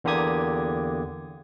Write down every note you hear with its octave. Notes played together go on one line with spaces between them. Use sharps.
E2 D3 A#3 G4 D#6 G#6